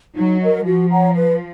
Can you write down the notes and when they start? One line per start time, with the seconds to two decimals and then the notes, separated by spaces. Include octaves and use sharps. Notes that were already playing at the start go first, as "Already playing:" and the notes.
0.17 F#3 D#4
0.41 A#4 D#5
0.66 F3 F#4
0.90 C#5 F#5 A#5
1.15 B4